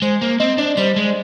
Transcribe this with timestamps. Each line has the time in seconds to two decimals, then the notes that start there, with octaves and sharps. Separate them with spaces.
0.02 G#3 C5
0.22 A#3
0.40 C4 D#5
0.58 D4 D5
0.77 G3 C5
0.96 G#3